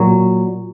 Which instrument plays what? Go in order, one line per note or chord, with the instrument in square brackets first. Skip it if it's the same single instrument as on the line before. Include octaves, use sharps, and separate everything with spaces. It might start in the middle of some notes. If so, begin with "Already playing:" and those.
Already playing: [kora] A#2 F#3